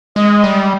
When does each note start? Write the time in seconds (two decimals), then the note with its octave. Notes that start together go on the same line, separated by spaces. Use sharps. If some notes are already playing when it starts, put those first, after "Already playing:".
0.16 G#3 D#5
0.44 G3